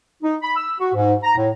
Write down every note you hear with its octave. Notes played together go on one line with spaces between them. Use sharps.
D#4
B5
E6
F#4
G#2
A#5
A2